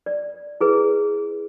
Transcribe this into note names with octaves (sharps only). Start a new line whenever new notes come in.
D5
E4 G#4 B4